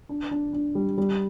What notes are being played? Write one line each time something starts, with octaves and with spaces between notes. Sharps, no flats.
D4
D4
D4
G3
G3